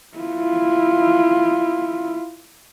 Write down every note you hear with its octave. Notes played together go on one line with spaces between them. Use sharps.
E4 F4